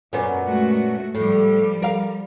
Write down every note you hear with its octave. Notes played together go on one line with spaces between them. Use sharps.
F#2 A#2 F#3 B3 C#4
G#3 A3 F#4
A2 F3 G3
A#4 F5